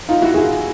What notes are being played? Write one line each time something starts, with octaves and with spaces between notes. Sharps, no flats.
D#4 F4
E4 F#4
F#4 G#4